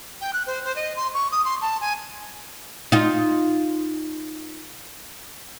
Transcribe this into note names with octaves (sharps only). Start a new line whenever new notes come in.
G5
F#6
C5
C5
D#5
C6
C#6
D#6
C6
A5
G#5
D#4 F4